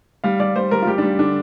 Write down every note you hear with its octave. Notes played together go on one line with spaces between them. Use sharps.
G3 F5
G3 D5
G3 C5
G3 A#4
F4
G3 G4
G3 D4
D3 D4